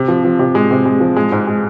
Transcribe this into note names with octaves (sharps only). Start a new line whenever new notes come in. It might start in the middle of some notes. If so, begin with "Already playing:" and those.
Already playing: C3
F3
F3
C3
G#3
C3
G#3
F3
G#3
G#2
G#3